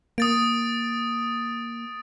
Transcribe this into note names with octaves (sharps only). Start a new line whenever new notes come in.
A#3 D#6 A6 D7